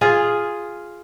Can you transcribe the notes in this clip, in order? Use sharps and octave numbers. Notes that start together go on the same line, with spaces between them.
F4 G#4